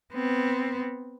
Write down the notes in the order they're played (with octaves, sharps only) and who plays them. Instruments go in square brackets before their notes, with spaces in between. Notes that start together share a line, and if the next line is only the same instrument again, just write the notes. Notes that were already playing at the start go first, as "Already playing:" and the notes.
[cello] B3 C4